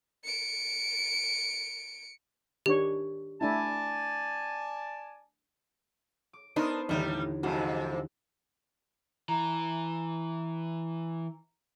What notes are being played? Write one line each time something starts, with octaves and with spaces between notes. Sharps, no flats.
C#7 D7
D#3 D4 G4 C#5
A3 D4 E4 D5 G#5 A5
D6
B3 D4 D#4 A#4 C5 B6 C7
D#2 A2 D3 E3 G3 B3 D#4
F2 G#2 C3 F#4
E3 A#5